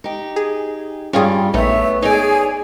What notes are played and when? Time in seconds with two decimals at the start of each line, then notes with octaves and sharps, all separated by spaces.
0.04 D#4 G4
0.36 G#4
1.13 G2 G3 C#4 F4 G#4
1.54 A#1 A3 B3 D#4 C#5 E5
2.02 D#4 G#4 C#5 D5 G#5